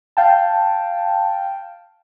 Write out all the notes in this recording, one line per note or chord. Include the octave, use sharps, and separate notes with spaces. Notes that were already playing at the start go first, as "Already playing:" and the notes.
F5 G5 A5